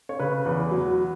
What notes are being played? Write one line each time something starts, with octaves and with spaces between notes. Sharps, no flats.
C#5
C#3 B4
E2
F#3